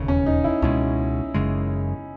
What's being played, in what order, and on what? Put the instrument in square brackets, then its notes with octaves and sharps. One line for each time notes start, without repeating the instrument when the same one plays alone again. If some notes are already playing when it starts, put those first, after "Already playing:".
Already playing: [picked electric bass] E1 D#2 C#3
[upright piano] C#4
D#4
E4
[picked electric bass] C#2 B2 G#3 [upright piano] C#4
[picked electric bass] F#1 F#2 C#3 G#3